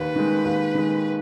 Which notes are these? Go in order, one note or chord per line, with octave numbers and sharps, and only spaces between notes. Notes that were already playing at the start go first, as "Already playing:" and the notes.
Already playing: D#2 B4
D#3 G#3
D#2
D#3 G#3